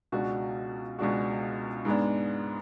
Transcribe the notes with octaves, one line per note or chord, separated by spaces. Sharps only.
C#2 B2 G#3 D4 F#4
C#2 B2 G#3 D4 F#4
G#2 G#3 B3 D4